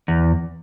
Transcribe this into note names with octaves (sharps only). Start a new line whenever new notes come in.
E2